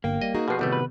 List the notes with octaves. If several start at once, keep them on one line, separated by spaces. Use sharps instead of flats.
G1 A#3 F5 G5
G3 D#5
D#4 F#4 G#4
B2 F3 G4 B4 C7
A1 C3 D#3 G3 A3 B3
B4